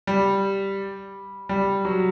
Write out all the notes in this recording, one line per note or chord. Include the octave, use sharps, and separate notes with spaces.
G3
G3
F#3